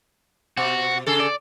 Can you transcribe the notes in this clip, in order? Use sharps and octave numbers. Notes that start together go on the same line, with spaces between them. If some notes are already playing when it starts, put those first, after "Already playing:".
B2 F#4
C#3 G#4 A4
D5